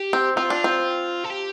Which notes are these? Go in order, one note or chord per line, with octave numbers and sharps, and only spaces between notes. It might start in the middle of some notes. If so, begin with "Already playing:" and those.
Already playing: G4
C4
C4 F4
D4
C4
A4
G4